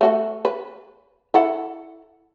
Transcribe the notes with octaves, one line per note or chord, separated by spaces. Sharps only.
A3 F#4 A4
B4
E4 A4 F#5